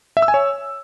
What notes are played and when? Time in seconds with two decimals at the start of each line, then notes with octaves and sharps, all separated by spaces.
0.17 E5
0.22 E6
0.28 G#5
0.34 C#5